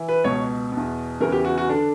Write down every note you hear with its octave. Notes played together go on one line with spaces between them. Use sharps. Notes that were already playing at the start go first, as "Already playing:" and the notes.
Already playing: E3
B4
C#2 B2 C#5
E2 B2
E2 C#3 E3 A#4
G4
F#4
F#4
D3 D4